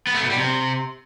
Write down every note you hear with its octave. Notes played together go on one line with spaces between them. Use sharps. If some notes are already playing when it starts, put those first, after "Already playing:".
B3
A3
B2
G3
C3